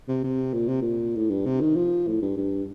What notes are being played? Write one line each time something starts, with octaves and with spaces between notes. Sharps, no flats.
C3
C3
A#2
C3
A#2
A2
G2
C3
D#3
F3
A2
G2
G2